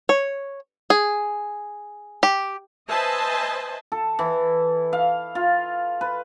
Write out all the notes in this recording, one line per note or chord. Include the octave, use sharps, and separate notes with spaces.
C#5
G#4
G4
B4 C5 D#5 E5 G#5 A5
A4
E3
F5
F4
B4